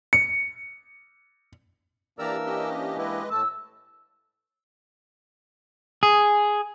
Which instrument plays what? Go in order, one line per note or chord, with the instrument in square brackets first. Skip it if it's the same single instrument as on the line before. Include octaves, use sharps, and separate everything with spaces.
[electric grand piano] C#7
[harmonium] E3 A#3 D4 [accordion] G4 D5 A#5 [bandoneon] A#4 E6
[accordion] C#4 G4 D#5
[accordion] G#3 B4 D#5 [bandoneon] E4 G4
[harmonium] A2 [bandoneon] A3 [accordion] A5 [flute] E6
[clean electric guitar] G#4